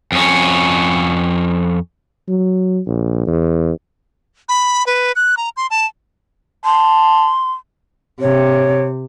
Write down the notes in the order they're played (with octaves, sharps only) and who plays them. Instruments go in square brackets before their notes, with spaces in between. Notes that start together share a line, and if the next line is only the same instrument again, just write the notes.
[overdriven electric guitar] F2 C#4
[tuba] F#3
A#1
E2
[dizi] B5
B4
F#6
A#5
C6
A5
[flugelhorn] A5 [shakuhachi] C6
[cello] C3 [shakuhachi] C#5